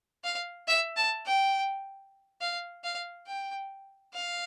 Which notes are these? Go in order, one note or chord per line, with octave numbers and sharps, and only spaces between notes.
F5
E5
A5
G5
F5
F5
G5
F5